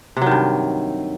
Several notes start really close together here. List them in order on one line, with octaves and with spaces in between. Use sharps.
C3 F#3 D#3 G2